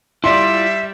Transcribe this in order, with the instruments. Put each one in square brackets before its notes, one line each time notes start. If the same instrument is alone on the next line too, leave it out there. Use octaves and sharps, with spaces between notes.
[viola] G3 [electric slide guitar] E4 F4 D5 [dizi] E5 [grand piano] C6